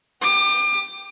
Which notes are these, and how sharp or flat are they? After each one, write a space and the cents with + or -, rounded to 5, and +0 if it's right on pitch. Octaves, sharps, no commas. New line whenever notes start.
G4 +5 D6 +35